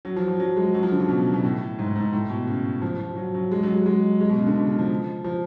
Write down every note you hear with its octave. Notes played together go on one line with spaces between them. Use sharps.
F#3
F3
F3
F#3
G#3
F#3
F3
D3
C#3
B2
B2
A2
G#2
G#2
A2
B2
C#3
F3
F3
F#3
F#3
G#3
F#3
G#3
G#3
G#3
B2
C#3
D3
B2
C#3
F3
F3